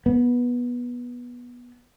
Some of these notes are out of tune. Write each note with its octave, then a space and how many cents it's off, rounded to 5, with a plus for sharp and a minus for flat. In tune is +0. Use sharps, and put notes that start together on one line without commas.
B3 -15